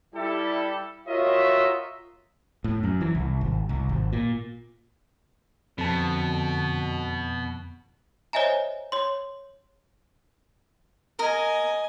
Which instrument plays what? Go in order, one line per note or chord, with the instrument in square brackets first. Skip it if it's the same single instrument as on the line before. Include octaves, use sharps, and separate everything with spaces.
[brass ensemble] G3 E4 G4 A4
F4 F#4 A#4 C#5 D#5 E5
[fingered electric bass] A2
F#2
E3
C2
G#1
C2
G#1
A#2
[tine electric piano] F2 A5 [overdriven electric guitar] B2 [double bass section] D3
[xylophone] C5 C#5 D#5 E5 G#5 A#5
C#5 C6
[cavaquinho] A#4 [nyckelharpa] D#5 G#5